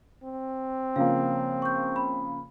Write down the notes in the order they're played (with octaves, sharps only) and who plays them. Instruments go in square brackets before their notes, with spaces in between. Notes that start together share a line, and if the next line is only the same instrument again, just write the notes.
[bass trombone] C4
[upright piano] C#3 F3 A#3 [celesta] F5
[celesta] C#6 G6
B5